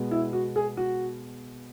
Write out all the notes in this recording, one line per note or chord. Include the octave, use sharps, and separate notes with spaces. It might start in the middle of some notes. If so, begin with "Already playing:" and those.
Already playing: B2 G#3 B3
E4
F#4
G#4
F#4